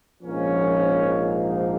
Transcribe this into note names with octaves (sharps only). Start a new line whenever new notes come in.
A#1 G#2 F3 A#3 C#4
D#4